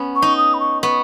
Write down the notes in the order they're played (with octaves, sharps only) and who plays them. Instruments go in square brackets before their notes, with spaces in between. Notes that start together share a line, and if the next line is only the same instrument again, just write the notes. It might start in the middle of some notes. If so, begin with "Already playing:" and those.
Already playing: [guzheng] B3 C#4
[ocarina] C#6
[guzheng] D#4
[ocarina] D#6
B5
C#6
[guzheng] B3 [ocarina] C#6